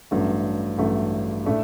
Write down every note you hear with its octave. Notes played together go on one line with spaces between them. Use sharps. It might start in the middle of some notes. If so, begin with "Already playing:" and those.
A1 G2 F#3 A3
A1 G2 F#3 A3
A2 A3 D4